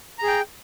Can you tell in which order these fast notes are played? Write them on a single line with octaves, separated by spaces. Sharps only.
A#5 G#4 G5